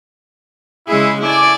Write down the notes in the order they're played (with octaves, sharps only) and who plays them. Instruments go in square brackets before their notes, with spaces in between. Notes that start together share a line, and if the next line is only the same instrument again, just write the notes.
[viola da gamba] C#3 G#3 G#4 [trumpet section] E4
[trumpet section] A3 G#5 D6 [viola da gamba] E4 D5